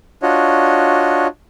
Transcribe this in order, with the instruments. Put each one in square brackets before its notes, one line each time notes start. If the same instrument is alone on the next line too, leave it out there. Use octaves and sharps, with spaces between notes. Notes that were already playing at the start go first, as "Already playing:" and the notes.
[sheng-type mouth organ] D4 F4 F#4 C#5 D#5